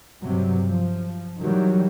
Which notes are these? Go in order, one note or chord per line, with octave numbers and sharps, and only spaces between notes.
G2 C3 F#3
F3
D#3 E3 F#3 G3